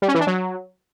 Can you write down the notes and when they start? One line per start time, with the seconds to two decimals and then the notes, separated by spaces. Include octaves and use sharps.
0.02 G3
0.08 C#4
0.14 E3
0.21 D4
0.27 F#3